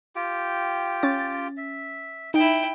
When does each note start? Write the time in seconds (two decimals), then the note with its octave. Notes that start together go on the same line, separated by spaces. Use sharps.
0.16 F4 G4 G5
1.03 C#4 A6
1.57 E5
2.34 D#4 E4 G5